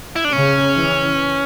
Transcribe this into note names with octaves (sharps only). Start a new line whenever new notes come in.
E4
D4
C#3 C#4
E3